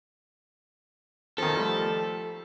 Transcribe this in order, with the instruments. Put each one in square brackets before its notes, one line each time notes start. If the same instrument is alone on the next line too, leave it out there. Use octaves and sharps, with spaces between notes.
[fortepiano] D#3 F3 [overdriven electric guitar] A4
[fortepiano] F3 G3 A3